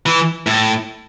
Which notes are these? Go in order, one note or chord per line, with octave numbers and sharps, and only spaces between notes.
E3
A2